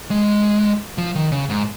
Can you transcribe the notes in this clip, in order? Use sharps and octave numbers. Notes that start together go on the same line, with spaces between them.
G#3
F3
D#3
C#3
G#2